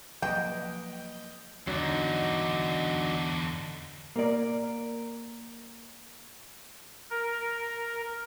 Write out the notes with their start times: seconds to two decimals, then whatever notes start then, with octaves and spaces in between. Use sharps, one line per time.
0.22 F3 F#3 A#3 B4 D#5 G5 G6
1.67 E2 D3 F#3 D4 D#4
4.16 A#3 A#4 D5
7.10 A#4